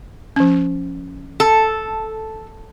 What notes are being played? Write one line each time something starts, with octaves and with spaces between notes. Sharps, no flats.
F3 C#4
A4